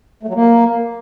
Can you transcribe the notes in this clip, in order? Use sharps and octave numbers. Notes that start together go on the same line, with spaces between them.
A3
F#3
A#3